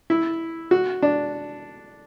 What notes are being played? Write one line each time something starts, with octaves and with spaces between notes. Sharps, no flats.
E4
F#4
D4